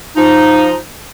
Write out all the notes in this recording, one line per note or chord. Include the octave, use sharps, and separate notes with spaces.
F3 D#4